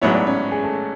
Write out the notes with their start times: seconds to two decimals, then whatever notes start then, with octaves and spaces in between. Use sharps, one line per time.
0.02 A1 G#2 F#3 B3 E4 C#5
0.14 D5
0.26 C#4 C#5
0.52 G#4
0.63 A3 A4